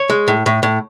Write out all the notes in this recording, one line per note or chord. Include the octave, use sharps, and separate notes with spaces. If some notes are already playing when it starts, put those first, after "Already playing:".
Already playing: C#5
G#3
A2
A2
A2